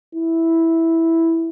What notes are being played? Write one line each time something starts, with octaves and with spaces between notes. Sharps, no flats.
E4